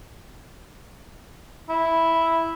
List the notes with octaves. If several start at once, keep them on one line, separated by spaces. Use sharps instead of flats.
E4